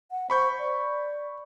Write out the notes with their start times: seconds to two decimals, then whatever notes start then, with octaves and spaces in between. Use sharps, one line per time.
0.11 F#5
0.30 C5 B5 C#6 G6
0.59 D5